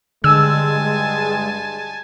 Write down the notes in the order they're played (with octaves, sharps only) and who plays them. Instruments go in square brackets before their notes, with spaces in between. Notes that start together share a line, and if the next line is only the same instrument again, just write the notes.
[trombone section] G2 G#3 [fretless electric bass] D3 [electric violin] G#5 A5 [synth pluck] E6